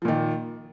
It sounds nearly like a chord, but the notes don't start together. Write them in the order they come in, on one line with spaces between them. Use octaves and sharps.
F3 A#2 D#3